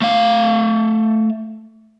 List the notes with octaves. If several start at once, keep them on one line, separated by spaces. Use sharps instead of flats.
A3 F5